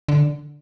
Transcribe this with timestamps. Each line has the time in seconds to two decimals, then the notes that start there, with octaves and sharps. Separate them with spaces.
0.08 D3